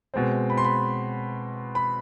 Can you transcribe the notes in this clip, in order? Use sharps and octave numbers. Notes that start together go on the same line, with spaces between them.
B2 G#3 C4
B5
C6
B5
B5